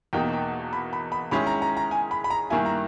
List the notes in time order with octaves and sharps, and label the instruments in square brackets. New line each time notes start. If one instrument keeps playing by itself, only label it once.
[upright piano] E2 B2 A#3 D#4 [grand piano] G5
[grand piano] G5
B5
B5
B5
[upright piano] D#3 G#3 C#4 E4 [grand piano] B5
[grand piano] A#5
A#5
A#5
G#5
B5
B5
A#5
[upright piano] G2 D#3 A#3 E4 [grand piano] G#5
[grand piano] A#5